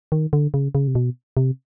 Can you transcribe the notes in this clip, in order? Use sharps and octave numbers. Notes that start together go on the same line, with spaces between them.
D#3
D3
C#3
C#3
C3
B2
C3